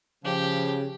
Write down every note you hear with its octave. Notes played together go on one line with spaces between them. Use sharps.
C#3 F3 G4